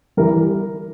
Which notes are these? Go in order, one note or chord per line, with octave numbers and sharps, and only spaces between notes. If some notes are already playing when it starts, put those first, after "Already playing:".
E3 G3 A#4